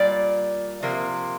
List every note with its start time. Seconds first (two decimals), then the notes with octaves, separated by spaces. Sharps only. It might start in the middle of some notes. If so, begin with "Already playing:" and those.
Already playing: A#2 G3 D5
0.83 C3 F3 A#3